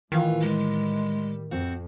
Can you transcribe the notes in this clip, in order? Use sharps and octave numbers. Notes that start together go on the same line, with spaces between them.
A2 D#3 E3 F4
G3 G#3
F2 C4 F#4